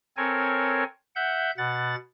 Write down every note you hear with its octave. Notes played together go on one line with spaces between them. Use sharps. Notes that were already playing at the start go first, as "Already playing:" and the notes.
C4 A4 A#4 C#5 G#5
E5 F#5 G6
B2 F#5 A6